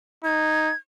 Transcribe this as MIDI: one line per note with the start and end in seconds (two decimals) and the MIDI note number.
0.24 0.71 63
0.24 0.76 92